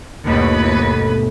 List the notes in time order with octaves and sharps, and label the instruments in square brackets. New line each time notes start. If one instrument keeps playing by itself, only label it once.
[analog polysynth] G1 B2 A3 [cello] D#2 B4